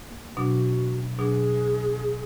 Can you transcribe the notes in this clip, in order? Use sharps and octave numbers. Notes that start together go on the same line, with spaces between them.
A#3
B2 F#3 D4 F#4
B2 F#3 D4 G#4